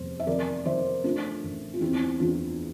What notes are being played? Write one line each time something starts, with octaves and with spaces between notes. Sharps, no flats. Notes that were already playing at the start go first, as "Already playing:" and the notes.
Already playing: F1 E2 C5
E5
F2 A#4 D5
F3 C5 E5
A3 D4 F4
A1
F4
E2 C4 E4
E2 D4 F4